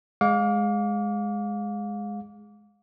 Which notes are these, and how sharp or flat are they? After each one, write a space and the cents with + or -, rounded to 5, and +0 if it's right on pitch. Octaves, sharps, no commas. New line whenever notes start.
G#3 +0 F5 +30 D6 -25